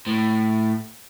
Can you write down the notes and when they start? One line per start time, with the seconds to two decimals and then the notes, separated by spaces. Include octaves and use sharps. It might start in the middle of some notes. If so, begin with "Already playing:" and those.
0.07 A2